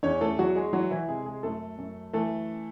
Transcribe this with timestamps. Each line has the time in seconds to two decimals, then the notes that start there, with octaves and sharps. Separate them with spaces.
0.03 E2 C#4 C#5
0.21 A3 A4
0.39 E2 F#3 F#4
0.55 G#3 G#4
0.73 E3 F#3 F#4
0.91 E3 E4
1.08 C3 G#3 G#4
1.26 G#3 G#4
1.43 F#2 A3 A4
1.78 F#2
2.13 E3 A3 A4